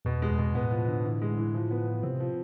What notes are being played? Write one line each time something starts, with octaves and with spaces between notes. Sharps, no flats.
E2 B2
G#3
E2
B2
A2 B3
F3
D3
E3
G#3
E3
F3
B3
F3
C3 C4
F3